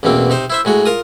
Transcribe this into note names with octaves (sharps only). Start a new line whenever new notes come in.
A1 E2 B2 A#3 C4
C3 D#4 C5
E4 C5 E5
A2 G#3 F#4
F4 A#4 D#6